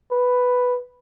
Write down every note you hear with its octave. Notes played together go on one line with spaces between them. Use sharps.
B4